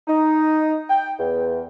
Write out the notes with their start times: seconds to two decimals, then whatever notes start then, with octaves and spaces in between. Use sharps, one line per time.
0.08 D#4
0.89 G5
1.19 E2